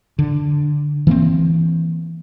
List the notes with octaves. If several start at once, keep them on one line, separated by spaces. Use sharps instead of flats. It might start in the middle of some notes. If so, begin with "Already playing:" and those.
D3
E3 A#3 C4